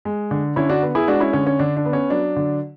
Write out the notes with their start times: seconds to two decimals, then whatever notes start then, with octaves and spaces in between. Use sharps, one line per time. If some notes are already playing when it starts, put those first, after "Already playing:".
0.05 G#3
0.31 D3
0.56 D3 C#4 E4
0.69 D4 F#4
0.82 B3
0.95 E4 G#4
1.07 G#3 D4 F#4
1.20 C#4 E4
1.33 D3 C#4
1.47 C#4
1.59 D3 D4
1.77 D4
1.85 B3
1.93 C#4
2.10 F#3 D4
2.36 D3